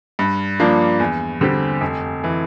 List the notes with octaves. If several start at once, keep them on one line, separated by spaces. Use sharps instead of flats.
G2
F3 A#3 D4
E2
D3 G3 C4 G4
F1
E3